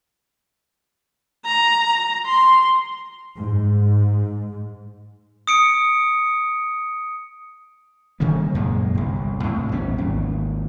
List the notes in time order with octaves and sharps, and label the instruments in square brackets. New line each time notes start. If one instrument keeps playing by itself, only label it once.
[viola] A#5
C6
[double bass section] G#2
[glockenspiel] D#6 C#7 D7
[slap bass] C3 D#3 G3 A#3
F#2 A#2 G#3
G1 C2
C#2 A2 C3
A#1 E2 G3 C#4
G#1 D#2